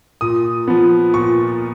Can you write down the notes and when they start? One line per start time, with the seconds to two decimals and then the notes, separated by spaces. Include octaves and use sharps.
0.21 A#2 D#6
0.68 F3 B3
1.14 A#2 C#6